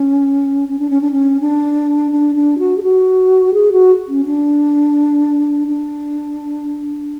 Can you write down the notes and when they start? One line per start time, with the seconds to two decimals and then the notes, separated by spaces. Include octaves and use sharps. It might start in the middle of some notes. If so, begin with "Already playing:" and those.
Already playing: C#4
0.69 C#4
0.79 D4
0.90 C#4
1.01 D4
1.12 C#4
1.41 D4
2.12 D4
2.36 D4
2.59 F#4
2.78 G#4
2.83 F#4
3.54 G#4
3.72 F#4
4.08 C#4
4.25 D4
5.68 D4